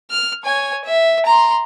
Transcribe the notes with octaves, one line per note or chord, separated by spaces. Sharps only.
F6
C#5 G#5
E5
A#5 C6